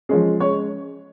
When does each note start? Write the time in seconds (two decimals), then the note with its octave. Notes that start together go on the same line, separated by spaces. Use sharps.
0.09 F3 G#3 C#4 G#4
0.40 G#3 C#4 C#5